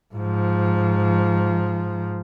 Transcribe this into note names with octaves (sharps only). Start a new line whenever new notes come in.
G#2 F3